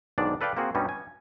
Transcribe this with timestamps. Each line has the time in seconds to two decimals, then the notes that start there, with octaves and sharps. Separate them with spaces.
0.18 B1 G#2 D#3 D4 D5
0.41 A4 B4 D5 F5 G5
0.57 A#3 C4 F#4 G#4
0.75 G2 B2 G3 C#4 D#4
0.89 G#5